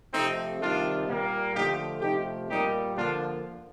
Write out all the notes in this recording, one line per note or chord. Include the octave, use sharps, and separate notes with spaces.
C3 F3 A3 C4 D#4
C3 D#3 G3 D4 F4
A#2 G3 A#3
D3 F3 A3 D#4 G4
C3 F3 A3 D#4 G4
A#2 G3 A#3 D#4 G4
D3 F3 A#3 D4 F4